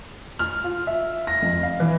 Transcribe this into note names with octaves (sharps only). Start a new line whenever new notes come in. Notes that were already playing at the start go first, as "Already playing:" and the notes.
F6
F4
E5
A#6
F2
F5
E3